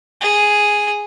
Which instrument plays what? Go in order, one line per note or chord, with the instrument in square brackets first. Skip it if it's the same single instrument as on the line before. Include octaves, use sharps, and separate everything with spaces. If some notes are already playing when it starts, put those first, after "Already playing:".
[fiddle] G#4